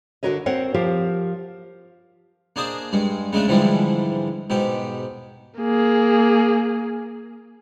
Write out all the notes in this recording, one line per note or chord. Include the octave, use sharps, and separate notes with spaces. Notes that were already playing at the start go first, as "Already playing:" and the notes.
D3 D4 F#4 A#4 C#5 D#5
C4 A#4 C5 C#5 F#5
F3 G4 A#4 C5
A#3 D4 G#4 C5 D#5
G2 G#3
C#3 G#3 A3 D4
G#2 D3 E3 F3 G3 G#3
G#2 B2 G4
A#3 G#4